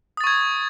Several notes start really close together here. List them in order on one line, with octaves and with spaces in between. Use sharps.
D#6 A6 C#6 G#6